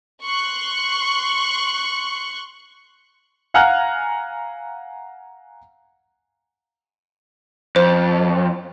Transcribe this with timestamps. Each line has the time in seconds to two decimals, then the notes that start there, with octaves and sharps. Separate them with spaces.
0.24 C6 C#6 F#6
3.54 F5 F#5 G#5 A#5 F6 F#6
7.76 F2 C5